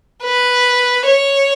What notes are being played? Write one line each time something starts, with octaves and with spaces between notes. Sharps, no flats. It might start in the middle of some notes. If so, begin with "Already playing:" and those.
B4
C#5